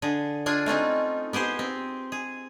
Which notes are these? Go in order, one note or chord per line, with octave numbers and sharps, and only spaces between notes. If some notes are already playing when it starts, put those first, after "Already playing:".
D3 G#4
D4 F4 G#4 G#5
A3 C4 C#4 D#4
B3 G4 G#4 C5
C4
G#4